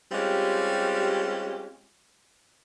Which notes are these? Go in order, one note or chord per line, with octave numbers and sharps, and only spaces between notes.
G3 G#3 C4 C#4 F4 G4